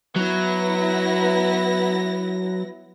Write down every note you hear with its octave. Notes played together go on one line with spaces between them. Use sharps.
F#3 B3 E4 A#6